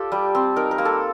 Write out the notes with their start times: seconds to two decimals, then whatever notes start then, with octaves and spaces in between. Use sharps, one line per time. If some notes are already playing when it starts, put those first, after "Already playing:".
Already playing: F4 G4 A4 D5
0.12 G3
0.35 C4
0.56 D#4 A#4
0.71 A#4
0.78 A#3
0.85 A4